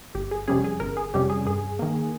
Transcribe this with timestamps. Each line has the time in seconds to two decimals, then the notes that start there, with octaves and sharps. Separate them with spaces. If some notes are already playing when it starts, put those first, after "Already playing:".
0.15 G1 G4
0.31 G#4
0.48 F2 C3 G3 C#4 G#4
0.64 G#4
0.80 G1 A#4
0.97 G#4
1.14 F2 C3 G3 C#4 G4
1.30 G#4
1.45 G2 G#4
1.79 D#3 A#3